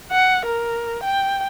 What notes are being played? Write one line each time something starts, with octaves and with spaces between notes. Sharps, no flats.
F#5
A#4
G5